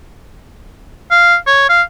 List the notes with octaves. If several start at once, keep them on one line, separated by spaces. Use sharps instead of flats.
F5
C#5
F5